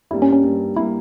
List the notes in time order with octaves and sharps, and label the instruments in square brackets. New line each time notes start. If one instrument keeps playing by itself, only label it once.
[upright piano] G2 G3 A#3 [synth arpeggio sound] E4
[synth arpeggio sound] C#4
C#4
[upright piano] G2 G3 A#3
[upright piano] G3 A#3 [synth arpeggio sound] E4